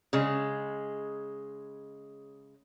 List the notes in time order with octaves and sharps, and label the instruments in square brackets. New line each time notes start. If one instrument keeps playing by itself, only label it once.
[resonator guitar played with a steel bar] C#3 G#3